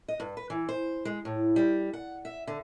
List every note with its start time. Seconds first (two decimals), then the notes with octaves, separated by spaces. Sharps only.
0.08 D#5
0.20 G2
0.37 B4
0.50 E3
0.69 C5
1.05 G#3
1.25 A2
1.56 G3
1.94 F#5
2.25 E5
2.47 D3